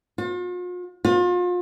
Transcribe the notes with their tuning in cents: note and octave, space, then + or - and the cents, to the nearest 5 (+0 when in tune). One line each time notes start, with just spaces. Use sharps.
F4 +45
F4 +35